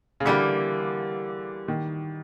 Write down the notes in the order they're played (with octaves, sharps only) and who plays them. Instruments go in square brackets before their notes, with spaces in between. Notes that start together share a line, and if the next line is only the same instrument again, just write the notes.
[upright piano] C#3
[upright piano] D3 [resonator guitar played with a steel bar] E3 G3 A#3
[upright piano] D#3